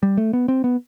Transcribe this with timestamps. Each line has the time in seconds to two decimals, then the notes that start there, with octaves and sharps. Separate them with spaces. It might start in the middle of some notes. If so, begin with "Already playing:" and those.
0.03 G3
0.17 A3
0.33 B3
0.48 C4
0.64 B3